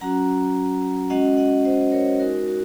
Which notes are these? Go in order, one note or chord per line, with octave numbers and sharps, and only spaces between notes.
F#3 C#4 F#4 F#5 A#5
G#3 C#4 F#4 D#5 F#5
D#5 F#5
C5 D#5
A#4 C#5
G#3 D#4 F#4 A#4
F#4 A#4